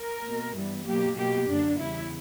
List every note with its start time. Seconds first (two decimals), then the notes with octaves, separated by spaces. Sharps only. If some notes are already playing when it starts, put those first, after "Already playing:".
Already playing: A#4
0.23 B2 A#3
0.54 G2 E3 G3 B3
0.86 B2 F#3 A#3 G4
1.17 B2 A#3 G4
1.48 F#2 D3 A#3 D4
1.79 E2 C#3 G3 B3 E4